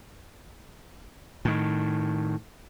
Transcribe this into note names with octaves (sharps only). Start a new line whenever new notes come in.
A2 D#3